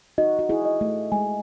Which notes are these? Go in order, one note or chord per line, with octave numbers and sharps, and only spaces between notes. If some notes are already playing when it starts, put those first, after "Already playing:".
D#4 F#4 D#5
F#4
E4 G#4
D#5
A3
G#3 G#5